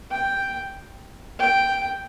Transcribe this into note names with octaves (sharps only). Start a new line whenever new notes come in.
G5
G5